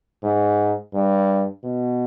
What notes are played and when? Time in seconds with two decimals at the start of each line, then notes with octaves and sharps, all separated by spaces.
0.23 G#2
0.94 G2
1.64 B2